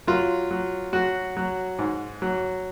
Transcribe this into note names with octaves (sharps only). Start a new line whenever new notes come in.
F#3 F4
F#3
F#3 F#4
F#3
G#2
F#3